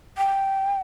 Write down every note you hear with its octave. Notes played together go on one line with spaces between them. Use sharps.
G5